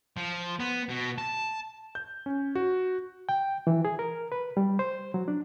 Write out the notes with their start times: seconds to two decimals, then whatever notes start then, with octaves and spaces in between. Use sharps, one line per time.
0.17 F3
0.60 B3
0.89 B2
1.18 A5
1.95 G6
2.26 C#4
2.55 F#4
3.29 G5
3.67 E3
3.85 G#4
3.99 A#4
4.32 B4
4.57 G3
4.79 C5
5.14 F#3
5.28 D4